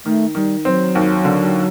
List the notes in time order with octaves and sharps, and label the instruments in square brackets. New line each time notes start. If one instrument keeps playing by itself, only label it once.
[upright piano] D#3 [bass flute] A3
[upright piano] D#3 [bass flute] G3
[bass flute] F#3 [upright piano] C4
[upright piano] D#2
D3